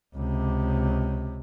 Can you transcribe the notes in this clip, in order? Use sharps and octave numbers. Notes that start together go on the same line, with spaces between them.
C#2 C3